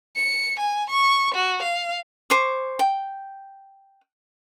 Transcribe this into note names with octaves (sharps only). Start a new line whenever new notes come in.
C#7
G#5
C#6
F#4
F5
C5 G#5 C#6 D6
G5